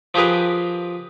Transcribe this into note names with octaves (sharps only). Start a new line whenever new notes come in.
F3 G4 G#4 A#4 B4